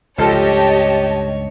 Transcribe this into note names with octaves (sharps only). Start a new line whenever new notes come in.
C#2 G2 F3 G4 A4 C#5 D#5 A5